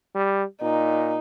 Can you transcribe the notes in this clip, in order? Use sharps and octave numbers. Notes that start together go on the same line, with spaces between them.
G3
A#2 D#4